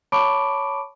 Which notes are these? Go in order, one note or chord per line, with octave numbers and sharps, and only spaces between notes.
C#5 A5 B5 C#6 D6 D7